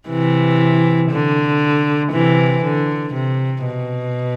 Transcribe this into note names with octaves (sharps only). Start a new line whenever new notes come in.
C3 E3
D3
C3 E3
D3
C3
B2